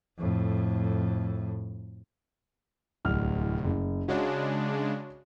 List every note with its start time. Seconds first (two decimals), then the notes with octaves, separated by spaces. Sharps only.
0.19 F2 A2
3.05 D1 C2 F6
3.64 F#1
4.08 C#3 G#3 D4 F#4 C#5